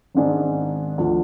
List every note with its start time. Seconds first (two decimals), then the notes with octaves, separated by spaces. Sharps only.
0.15 G#1 G#2 D#3 G#3 D4
0.98 D2 D3 F3